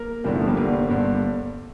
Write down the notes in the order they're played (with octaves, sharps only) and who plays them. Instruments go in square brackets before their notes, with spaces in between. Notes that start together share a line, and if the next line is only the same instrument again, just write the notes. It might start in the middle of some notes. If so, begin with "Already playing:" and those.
Already playing: [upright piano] A#3 [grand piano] A#4
[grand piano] G1 G2 D3 [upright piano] E3 G3
[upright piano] F3 A3
G3 A#3
[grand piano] G1 G2 D3
G1 G2 D3